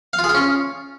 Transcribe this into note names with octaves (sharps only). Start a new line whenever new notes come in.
F5
F4
G#4
F4
C#4